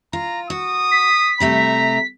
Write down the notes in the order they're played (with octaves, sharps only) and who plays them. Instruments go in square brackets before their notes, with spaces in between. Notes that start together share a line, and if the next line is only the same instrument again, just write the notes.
[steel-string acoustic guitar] F4 [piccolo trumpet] A#5
[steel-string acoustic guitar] F#4 [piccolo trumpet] D#6
[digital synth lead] B6
[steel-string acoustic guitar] C3 G3 A3 [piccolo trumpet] A#5